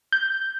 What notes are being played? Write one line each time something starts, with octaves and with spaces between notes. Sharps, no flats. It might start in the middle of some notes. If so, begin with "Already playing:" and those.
G6